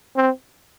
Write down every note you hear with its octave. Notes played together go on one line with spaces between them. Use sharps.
C4